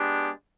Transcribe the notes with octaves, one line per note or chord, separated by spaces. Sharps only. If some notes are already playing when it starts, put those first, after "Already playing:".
Already playing: G#3 B3 D4 G4